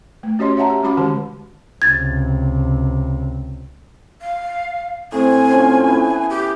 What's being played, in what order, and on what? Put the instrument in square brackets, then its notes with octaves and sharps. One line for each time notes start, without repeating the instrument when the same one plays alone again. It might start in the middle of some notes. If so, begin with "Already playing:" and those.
[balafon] A3
C#4 F#4 G4 C#5 D#5 C6
C#5 E5 F#5 A5 A#5
G4
G#3 C#4 F#4 B5 D6
D3 D#3 G#3 G4 A5
[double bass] C#2 C3 [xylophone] G#6 A6
[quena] F5
[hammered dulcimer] A2 [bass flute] C4 [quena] G#5
[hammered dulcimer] F3 C#4 C6
E3 B3
[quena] G4